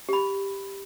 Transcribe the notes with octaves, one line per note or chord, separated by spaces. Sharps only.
G4 B5